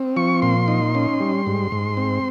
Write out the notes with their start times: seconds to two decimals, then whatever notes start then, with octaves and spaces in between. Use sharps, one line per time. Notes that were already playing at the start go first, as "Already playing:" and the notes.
Already playing: C4
0.16 F3 C#6
0.42 A#2 C6
0.68 D#4
0.95 C#4
1.20 G3
1.47 G#2
1.72 G#2
1.97 C4